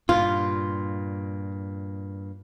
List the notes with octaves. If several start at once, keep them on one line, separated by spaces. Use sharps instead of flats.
G2 A#2 F4